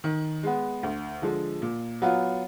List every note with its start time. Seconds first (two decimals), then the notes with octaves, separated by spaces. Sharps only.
0.04 D#3
0.43 G#3 B3
0.83 D2
1.22 D3 F3 G#3
1.62 A#2
2.02 F#3 B3 F4